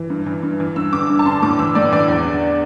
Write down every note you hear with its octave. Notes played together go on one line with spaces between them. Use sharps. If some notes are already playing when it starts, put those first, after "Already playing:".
Already playing: E3
G2
E3
G2
E3
G2 E6
D3 D6
G2
A5
D3 C6
A2 D6
E3 E6
A2 D5
E3 D5
E2
D3